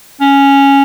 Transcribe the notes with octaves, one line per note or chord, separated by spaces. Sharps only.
C#4